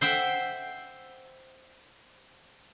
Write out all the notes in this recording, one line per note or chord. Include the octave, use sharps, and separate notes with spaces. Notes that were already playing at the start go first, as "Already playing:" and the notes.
C5 E5 F#5 G5